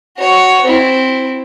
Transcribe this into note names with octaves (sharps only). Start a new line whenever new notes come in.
F#4 C#5
C4 E4